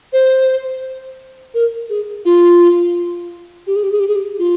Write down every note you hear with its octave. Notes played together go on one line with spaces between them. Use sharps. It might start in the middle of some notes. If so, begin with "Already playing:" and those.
C5
A#4
G#4
F4
G4
G#4
G4
G#4
G4
G#4
G4
F4